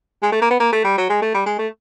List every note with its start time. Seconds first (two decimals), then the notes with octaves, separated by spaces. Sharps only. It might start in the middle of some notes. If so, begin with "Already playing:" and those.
0.23 G#3
0.32 A3
0.42 A#3
0.50 B3
0.60 A#3
0.72 A3
0.84 G3
0.98 F#3
1.10 G#3
1.22 A3
1.34 G3
1.46 G#3
1.59 A3